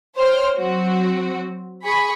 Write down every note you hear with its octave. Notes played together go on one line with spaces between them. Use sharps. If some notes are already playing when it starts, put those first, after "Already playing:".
C5 C#5 G5 F6
F#3 C4 F#4
G#4 B5 C#6